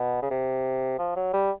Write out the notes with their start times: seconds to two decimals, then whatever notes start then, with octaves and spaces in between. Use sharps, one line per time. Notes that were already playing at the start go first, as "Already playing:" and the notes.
Already playing: B2
0.22 C#3
0.30 C3
0.99 F3
1.16 F#3
1.33 G3